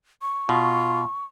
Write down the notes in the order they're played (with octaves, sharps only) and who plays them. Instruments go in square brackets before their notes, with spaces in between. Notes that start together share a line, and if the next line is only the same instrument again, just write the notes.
[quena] C#6
[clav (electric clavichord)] B2 [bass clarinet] F4